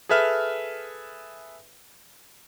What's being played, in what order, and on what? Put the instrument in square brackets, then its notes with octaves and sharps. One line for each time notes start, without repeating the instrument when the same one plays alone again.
[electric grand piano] G#4 A4 B4 E5 F6